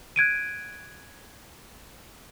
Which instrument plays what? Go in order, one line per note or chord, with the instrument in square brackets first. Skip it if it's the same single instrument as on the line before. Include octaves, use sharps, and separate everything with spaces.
[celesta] F#6 G#6 D7 D#7